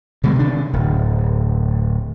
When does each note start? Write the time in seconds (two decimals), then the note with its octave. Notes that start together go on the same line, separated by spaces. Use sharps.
0.24 B2 D3 G3 G#3
0.35 C3 D#3 D4
0.73 D1